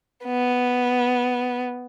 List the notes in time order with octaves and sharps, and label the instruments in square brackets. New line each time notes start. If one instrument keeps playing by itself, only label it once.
[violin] B3